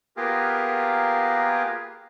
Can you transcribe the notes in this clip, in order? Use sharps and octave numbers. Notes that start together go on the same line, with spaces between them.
A#3 B3 F4 G4 G#4 A#4